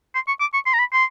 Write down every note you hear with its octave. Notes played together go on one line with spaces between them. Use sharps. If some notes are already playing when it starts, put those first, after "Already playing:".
C6
C#6
D6
C#6
C6
A#5
B5
C6